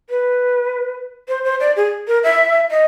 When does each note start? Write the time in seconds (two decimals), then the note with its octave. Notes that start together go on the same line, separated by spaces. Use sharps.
0.10 B4
1.28 C5
1.44 C5
1.60 D5
1.76 G#4
2.07 A#4
2.23 E5
2.71 D#5